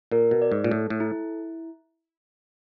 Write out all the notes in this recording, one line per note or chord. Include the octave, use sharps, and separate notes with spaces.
A#2 A#4
B2
D5
G#2
A#2
A2 A4
A2
E4